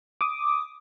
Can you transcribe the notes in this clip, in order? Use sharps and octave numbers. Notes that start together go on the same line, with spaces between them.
D6 D#6